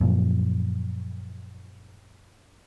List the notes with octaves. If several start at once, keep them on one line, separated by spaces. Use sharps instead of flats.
F#2 A#2 F3